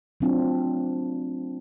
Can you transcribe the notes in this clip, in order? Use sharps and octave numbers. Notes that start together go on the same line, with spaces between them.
F#3 A3 C4 D4 F4